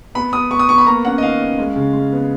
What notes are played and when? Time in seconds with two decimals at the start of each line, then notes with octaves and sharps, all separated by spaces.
0.15 B3 B5
0.33 B3 D#6
0.51 B3 C#6
0.59 D#6
0.69 B3 C#6
0.78 B5
0.86 A#3 A#5
1.05 C#4 F#5
1.18 D#5
1.22 D#3 F5
1.41 C#4
1.59 G#3
1.76 C#3
1.94 G#3
2.13 B3